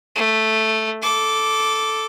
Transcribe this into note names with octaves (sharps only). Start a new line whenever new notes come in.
A3
A4 D6